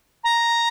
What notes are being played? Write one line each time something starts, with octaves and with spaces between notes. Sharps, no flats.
A#5